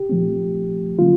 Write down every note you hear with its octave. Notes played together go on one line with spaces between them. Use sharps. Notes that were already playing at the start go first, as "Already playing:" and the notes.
Already playing: G4
A#2 F3 A3 C4
D3 F#3 A#3 C#4 F4